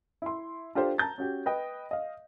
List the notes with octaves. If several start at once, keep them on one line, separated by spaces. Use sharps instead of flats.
E4 C6
D4 F4 G4 A4 C5
A5 A#5 G6 A6
C#4 F#4 G4
B4 D#5 G5
D#5 F5